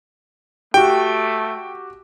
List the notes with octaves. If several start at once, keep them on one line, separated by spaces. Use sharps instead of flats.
A3 F#4 G4 G5